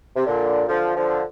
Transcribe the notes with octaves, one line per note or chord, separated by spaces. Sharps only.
C3
A#2 D3
D3 F3
D3 F3